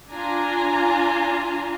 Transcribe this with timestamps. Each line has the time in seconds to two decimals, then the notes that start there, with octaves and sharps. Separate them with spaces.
0.12 D4 F4 G#5 A#5